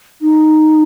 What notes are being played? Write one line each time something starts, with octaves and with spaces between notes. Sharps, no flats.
D#4